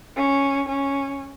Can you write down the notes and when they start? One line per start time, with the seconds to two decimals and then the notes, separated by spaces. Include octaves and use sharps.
0.16 C#4
0.69 C#4